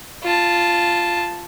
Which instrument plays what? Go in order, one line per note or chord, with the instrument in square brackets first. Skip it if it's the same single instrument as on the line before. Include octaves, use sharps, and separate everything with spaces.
[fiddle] F4 A5